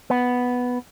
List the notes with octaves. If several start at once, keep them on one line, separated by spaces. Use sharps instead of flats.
B3